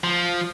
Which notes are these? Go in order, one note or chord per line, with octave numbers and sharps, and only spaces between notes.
F3